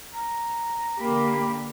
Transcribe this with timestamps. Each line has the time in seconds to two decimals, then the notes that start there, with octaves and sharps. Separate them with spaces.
0.13 A#5
1.00 D3 A#3 G4 B5